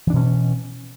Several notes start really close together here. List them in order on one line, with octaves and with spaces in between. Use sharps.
E3 D4 B2 C#4